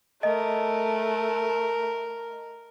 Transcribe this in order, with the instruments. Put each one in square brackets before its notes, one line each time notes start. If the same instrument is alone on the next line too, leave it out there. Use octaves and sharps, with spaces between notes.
[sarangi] A3 [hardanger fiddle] A#4 [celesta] D#5